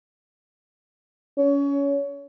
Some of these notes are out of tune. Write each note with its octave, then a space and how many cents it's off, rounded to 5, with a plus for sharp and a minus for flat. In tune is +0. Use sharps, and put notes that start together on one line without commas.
C#4 +25